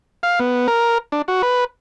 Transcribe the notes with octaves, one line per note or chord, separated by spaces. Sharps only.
F5
B3
A#4
D4
F#4
B4